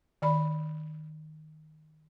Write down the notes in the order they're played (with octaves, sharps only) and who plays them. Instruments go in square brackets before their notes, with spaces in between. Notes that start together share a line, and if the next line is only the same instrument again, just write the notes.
[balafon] D#3 D5 B5